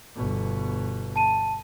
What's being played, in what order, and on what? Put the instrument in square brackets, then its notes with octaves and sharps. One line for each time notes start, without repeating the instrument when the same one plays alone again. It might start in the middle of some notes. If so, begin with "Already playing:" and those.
[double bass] G1 B2
[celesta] A5 D#7